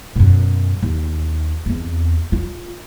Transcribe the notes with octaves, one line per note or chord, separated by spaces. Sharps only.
F#2 B2
D#2
E2 C4
F4